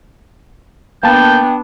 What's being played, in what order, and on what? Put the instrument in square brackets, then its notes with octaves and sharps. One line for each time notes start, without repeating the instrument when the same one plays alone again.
[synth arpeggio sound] A#3 A5 [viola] B3 D4 [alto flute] G5 [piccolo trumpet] G6